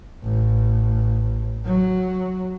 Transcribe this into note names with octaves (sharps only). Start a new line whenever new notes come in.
A1
F#3